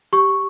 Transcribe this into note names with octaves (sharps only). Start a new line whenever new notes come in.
G4 C#6